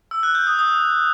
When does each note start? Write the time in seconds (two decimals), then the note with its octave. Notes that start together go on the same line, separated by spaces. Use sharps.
0.11 E6
0.23 F#6
0.35 G6
0.47 D#6
0.59 D#6